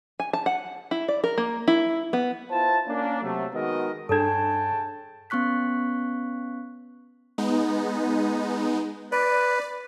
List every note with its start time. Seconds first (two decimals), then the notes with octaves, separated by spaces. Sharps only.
0.20 G#5
0.33 A5
0.46 F#5
0.91 E4
1.08 D5
1.24 A#4
1.38 A#3
1.68 E4
2.13 B3
2.50 E4 F4 C5 A5
2.86 A#3 C#4 D4
3.22 C3 F#3 A3
3.53 D#3 G#3 B3 F#4 A#4 D#5
4.09 G2 C#4 D4 G#4 A4 G5 A5 G#6
5.30 B3 C#4 C#6 F#6 B6
7.38 G#3 B3 D#4
9.12 B4 D5